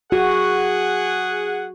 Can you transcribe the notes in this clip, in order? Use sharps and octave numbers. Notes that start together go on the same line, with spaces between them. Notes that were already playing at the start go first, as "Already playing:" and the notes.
F#4 G#4 F#5